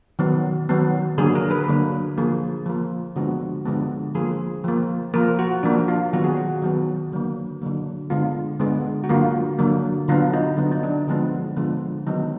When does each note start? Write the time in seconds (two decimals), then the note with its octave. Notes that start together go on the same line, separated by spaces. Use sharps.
0.19 D#3 F#3 B3
0.69 D#3 F#3 B3
1.18 D3 F#3 A#3 G#4
1.35 A#4
1.51 B4
1.68 D3 F#3 A#3
2.18 F3 A#3 G#4
2.66 F3 A#3
3.16 D3 F3 G#3 B3 F#4
3.65 D3 F3 G#3 B3
4.15 F3 A#3 G#4
4.64 F3 A#3
5.14 F3 A#3 A#4
5.39 F#4
5.63 F3 A#3 D4
5.88 F4
6.13 D#3 F#3 B3 F#4
6.24 G#4
6.36 F#4
6.62 D#3 F#3 B3
7.12 D3 F#3 A#3
7.62 D3 F#3 A#3
8.10 D3 G#3 B3 F4
8.60 D3 G#3 B3
9.04 F#4
9.09 D3 F#3 A#3 F4
9.59 D3 F#3 A#3
10.08 D3 F#3 B3 F4
10.33 D#4
10.57 D3 F#3 B3
10.72 D#4
10.83 D4
11.07 D3 F3 G#3 B3
11.57 D3 F3 G#3 B3
12.07 D#3 F#3 B3 D#4